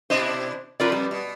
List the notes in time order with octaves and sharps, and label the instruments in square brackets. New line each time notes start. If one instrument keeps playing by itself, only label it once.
[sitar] B2 D4 E4 [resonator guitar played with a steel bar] C5 D#5
[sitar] F2 B2 B4 [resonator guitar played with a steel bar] F4 A#4 D5
[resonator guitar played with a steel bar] G3
[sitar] B2